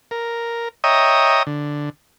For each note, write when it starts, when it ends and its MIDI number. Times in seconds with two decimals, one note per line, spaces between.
0.11 0.68 70
0.84 1.43 73
0.84 1.43 75
0.84 1.43 76
0.84 1.43 79
0.84 1.43 82
0.84 1.43 87
1.47 1.90 50